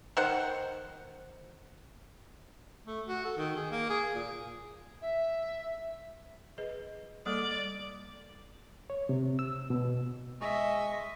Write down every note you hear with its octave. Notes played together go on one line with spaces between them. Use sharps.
D#3 C5 F#5
A3
F#4
A4
D#3
G#4
A#3
G#4
A#2
E5
G#4 B4 D#5
G3 A#3 A4 D5
C#5
C3
E6
B2
G#3 D#5 E5 C#6